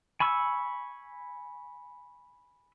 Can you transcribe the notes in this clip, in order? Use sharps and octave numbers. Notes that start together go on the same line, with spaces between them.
G#5 B5 C#6 E6